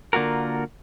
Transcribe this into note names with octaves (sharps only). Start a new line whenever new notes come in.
D3 A#3 F4 F#4 A#4